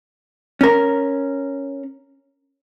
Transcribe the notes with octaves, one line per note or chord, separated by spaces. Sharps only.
C#4 A#4